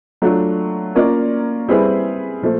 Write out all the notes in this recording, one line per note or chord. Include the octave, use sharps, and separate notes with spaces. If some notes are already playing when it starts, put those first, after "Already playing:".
F#3 A3 D4 F4
A#3 C#4 F4 A#4 D5
G3 C4 E4 G#4 B4
A#2 F3 A3